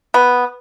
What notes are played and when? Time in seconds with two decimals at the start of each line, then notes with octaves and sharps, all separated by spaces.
0.14 B3